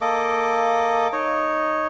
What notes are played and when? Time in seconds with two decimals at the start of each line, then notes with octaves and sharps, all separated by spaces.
0.01 A#3 A4 D#5 D6
1.13 D#4 C#5